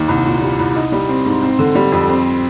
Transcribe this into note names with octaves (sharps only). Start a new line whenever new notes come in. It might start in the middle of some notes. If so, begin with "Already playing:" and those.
Already playing: D#2
C2
A#2
G3
C2
D#4
G3
C4
G#2
C4
D3
G3
F2
C4